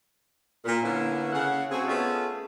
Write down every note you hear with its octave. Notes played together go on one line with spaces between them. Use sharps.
A#2 A#4
D3 A#3 B3 C#4 E4
C#3 F#5
A3 C4 F#4 G#4
A3 B3 C#4 D#4 F4 G#4